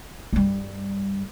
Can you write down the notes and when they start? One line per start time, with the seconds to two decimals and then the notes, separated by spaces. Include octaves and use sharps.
0.33 G2 G3